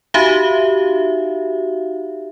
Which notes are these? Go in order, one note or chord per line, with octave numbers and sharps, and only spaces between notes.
D#4 F#4 G4 E5 F5